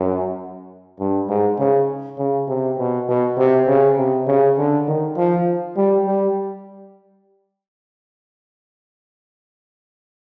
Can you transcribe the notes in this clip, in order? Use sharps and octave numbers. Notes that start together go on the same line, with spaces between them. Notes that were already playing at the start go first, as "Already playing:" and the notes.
Already playing: F#2
G2
G#2
C#3
C#3
C3
B2
B2
C3
C#3
C3
C#3
D3
D#3
F3
G3
G3